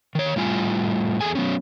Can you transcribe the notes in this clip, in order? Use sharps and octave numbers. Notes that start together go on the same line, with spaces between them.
D#3 C#5
A2 G3 F4 G#5
E2 G#4 A4 G#5
F#3 B3 C#4